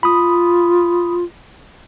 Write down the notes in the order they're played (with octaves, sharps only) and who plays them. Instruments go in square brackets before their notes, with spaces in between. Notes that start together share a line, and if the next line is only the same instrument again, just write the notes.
[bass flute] F4 [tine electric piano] B5 D#6